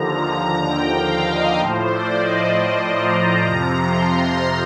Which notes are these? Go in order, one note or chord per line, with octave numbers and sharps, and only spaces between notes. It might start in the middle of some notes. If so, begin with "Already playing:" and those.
Already playing: D#2 D3 F3 A#5
A#5
G5
F5
D#5
A2 F3 C5
D5
D#5
D#5
A#5
F2 C3 F3 A#5
C6